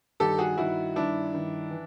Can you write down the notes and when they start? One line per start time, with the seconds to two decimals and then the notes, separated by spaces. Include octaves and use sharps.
0.20 G2 D#3 G4 A4
0.38 F#4 G#4
0.57 G2 D#3 E4 F#4
0.96 G2 D#3 D4 E4
1.34 G2 D#3
1.71 E3